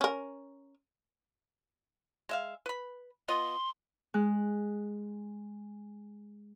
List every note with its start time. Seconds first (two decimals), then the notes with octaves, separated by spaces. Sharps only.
0.01 C#4 A#4
2.29 G#3 E5 F5
2.66 B4 B5
3.28 B3 F4 D#5 C6
4.14 G#3 F#6